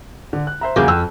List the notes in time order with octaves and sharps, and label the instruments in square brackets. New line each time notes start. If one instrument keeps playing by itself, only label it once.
[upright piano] D3
F#6
C5 E5 A#5
[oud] E2 C#3 A#3 [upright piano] F#4 D6 G6
[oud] F2 [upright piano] G5 E6